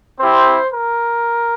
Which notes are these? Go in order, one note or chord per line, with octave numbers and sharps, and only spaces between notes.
C4 E4 G4 C5
A#4